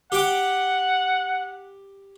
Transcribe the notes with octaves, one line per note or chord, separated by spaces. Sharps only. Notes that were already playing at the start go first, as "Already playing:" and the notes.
G4 F#5 G5 D6